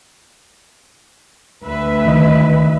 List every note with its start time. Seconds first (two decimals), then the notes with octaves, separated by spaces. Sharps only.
1.65 D2 B4 E5
2.05 C#2 D#3 D#5